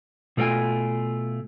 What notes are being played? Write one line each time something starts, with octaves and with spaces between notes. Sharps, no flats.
B2 A3 F4 G#4 G5 G#5